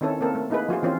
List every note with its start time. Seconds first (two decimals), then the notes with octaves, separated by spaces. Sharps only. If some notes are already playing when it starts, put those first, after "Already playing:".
0.01 D#3 C4 C#4 E4 A4 C#5
0.21 A#3 C4 A4 A#4
0.35 A3
0.50 A#3 D#4 E4 G#4 B4
0.69 F3 F4 F#4 G#4
0.83 E3 C4 C#4 F4 C5